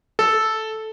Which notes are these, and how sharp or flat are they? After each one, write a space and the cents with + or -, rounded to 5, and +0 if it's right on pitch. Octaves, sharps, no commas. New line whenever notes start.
A4 -5